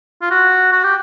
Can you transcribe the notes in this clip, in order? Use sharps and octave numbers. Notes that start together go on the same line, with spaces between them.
F4
F#4
F#4
G4